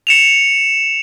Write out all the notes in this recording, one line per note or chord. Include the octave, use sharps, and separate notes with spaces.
C#7 E7 F7